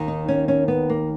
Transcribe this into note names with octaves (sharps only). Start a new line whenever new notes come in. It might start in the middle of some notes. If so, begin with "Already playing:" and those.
Already playing: D#2 D#3
D#4
C#4
C#4
B3
A#3